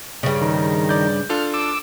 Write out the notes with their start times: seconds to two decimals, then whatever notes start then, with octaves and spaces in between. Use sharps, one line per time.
0.23 G2 C#3
0.41 D#3
0.89 D5 G6
1.29 D4 F4 A4 F6
1.54 D6 E6